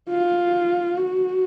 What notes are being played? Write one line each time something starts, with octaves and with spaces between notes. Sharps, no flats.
F4
F#4